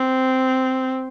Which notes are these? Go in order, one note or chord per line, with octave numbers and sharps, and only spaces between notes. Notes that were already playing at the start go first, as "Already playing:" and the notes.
Already playing: C4